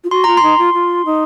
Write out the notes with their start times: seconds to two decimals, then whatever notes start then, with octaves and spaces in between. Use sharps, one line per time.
0.04 F4
0.11 F#4 C6
0.24 F4 A#5
0.37 C6
0.43 D#4
0.59 F4
0.74 F4
1.06 D#4